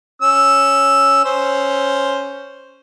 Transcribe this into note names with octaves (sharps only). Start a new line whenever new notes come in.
C#4 E6
C#4 C5